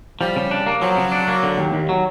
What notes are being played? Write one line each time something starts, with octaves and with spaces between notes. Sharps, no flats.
F3 G3
C#3
D4
A#3
F3 F#3
C#3
D4
A#3
D3
D#2
D#2
F#3